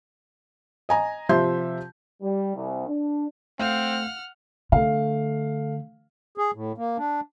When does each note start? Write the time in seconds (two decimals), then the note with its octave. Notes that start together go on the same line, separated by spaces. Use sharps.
0.89 D#5 G#5 A#5
1.29 C3 F3 E5 C6 G6
2.22 G3
2.55 C2
2.88 D4
3.59 A3 C4 F5 F#5 F6 G6
4.72 D3 A3 F5
6.38 G#4
6.55 A2
6.78 A#3
6.98 D4